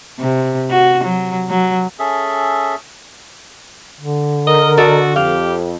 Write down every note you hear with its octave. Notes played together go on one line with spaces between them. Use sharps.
C3
F#4
F#3
F#3
C#4 G#4 A4 E5
D3
A#4 D#5
F#4 A4 D5 D#5
F2 G4 F5